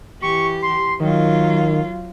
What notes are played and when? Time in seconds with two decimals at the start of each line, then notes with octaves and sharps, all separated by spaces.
0.22 E3 G4 C#6
0.62 C6
1.00 D#3 F#3 F4